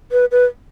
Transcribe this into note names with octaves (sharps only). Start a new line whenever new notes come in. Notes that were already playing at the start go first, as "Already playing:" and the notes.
B4
B4